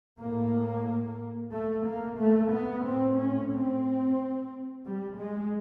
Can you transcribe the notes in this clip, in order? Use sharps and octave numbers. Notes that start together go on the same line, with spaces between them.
A2 A#3
A3
A#3
A3
B3
A2 C4
C#4
C4
G3
G#3